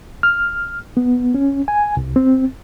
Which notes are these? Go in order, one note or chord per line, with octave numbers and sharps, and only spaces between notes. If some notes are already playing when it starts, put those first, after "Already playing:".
F6
B3
C#4
G#5
C2
C4